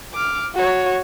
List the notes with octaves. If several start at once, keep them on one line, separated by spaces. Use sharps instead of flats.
D6 F6
F#4 C#5